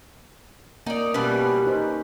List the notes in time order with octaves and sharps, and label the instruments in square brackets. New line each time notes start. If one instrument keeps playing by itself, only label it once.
[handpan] A#3 [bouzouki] D#4 D5
[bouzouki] B2 E3 G3 [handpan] C#4 B4
[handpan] D#4 C5